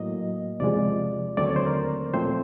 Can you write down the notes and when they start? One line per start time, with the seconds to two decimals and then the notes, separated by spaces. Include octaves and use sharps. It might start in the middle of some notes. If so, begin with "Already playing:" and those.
Already playing: A2 F#3 A#3 D#5
0.60 E2 C3 F3 G#3 D5
1.37 D#2 D3 F#3 A3 C4 D5
1.47 C#5
1.56 C5
1.66 A#4
2.14 A#2 F3 A3 C4 C5